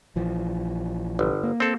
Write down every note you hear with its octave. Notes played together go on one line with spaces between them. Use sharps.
A#1 E3 F3
G1
A#3
C4 A4